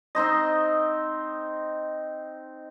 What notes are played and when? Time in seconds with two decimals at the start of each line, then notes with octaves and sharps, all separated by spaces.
0.15 C4 D#4 C5 D#5